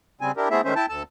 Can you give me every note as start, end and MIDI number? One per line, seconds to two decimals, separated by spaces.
0.21 0.32 49
0.21 0.32 55
0.21 0.32 60
0.21 0.32 80
0.37 0.49 62
0.37 0.49 64
0.37 0.49 67
0.37 0.49 70
0.51 0.61 57
0.51 0.61 59
0.51 0.61 60
0.51 0.61 64
0.51 0.61 68
0.51 0.61 76
0.64 0.74 51
0.64 0.74 56
0.64 0.74 57
0.64 0.74 61
0.64 0.74 72
0.64 0.74 76
0.76 0.86 64
0.76 0.86 79
0.76 0.86 81
0.89 1.03 38
0.89 1.03 69
0.89 1.03 81
0.89 1.03 88